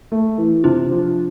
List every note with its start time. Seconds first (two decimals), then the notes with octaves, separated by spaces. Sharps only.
0.12 A3
0.38 E3
0.64 C3 D4 F4
0.91 F3